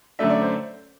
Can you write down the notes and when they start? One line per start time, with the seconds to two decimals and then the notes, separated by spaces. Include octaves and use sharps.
0.19 F#2 D3 A3 D4 E5
0.30 D5
0.41 C5